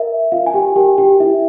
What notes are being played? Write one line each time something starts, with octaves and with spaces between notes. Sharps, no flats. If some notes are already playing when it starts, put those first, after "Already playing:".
Already playing: A#4 E5
F4 F5
G#5
G4 G5
G4 A#4 G5
G4 G5
E4 E5